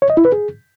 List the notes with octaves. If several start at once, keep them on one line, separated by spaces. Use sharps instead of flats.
C#5
D#5
E4
B4
G#4